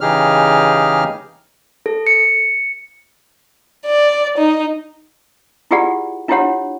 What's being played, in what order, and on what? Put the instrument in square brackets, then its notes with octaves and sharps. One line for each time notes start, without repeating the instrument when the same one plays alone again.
[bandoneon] C#3 E3 D#4 G4 G#4 F6
[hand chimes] A4
C#7
[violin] D5
D#4
[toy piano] E4 F4 G4 G#4 D5 F#5
D4 E4 F4 G4 C#5 F#5